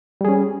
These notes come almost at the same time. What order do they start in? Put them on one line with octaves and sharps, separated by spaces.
G3 G#4 C#4